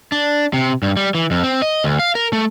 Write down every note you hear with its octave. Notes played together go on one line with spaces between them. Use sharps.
D4
C3
G2
G3
E3
F2
C4
D#5
D2
F5
A#4
A3